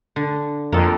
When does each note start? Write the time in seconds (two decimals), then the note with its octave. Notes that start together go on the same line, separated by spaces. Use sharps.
0.16 D3
0.72 F2 A#3 A4